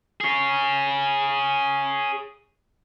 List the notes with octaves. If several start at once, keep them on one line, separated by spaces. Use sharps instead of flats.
G#4 C#5